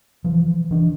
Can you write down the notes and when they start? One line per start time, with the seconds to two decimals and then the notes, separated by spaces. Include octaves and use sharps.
0.24 E3 F3
0.71 E3 D4